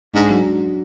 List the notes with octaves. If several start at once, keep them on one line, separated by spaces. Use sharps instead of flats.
G#2 D4
F#3